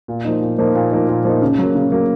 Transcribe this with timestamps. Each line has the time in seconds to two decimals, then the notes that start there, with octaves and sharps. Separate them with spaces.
0.08 A#2
0.25 F3 A#3 D#4
0.42 A#2
0.59 F3 A#3 D#4
0.75 A#2
0.91 F3 A#3 D#4
1.09 A#2
1.25 F3 A#3 D#4
1.42 C#3
1.58 F#3 A#3
1.75 C#3
1.92 F#3 A#3